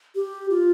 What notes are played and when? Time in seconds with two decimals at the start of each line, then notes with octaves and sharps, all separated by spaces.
0.15 G4
0.50 F4